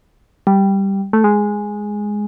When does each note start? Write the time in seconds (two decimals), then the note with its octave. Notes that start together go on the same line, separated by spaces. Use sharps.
0.47 G3
1.13 A3
1.24 G#3